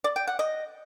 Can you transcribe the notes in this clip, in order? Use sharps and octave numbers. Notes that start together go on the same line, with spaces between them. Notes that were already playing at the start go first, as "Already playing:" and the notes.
D5
G5
F#5
D#5